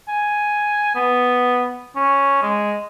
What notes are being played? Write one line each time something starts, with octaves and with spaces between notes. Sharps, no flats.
G#5
B3
C#4
G#3